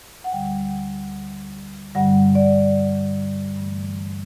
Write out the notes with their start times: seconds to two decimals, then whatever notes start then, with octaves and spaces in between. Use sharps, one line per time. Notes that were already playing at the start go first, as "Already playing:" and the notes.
0.24 F#5
0.32 D2 D3 G3 G5
1.95 G2 D3 G3 F#5
2.35 D5
3.57 G2 E3 A3